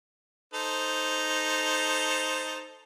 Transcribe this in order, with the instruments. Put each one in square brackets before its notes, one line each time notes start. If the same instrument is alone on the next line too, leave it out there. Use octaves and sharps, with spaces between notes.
[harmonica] D#4 A4 C5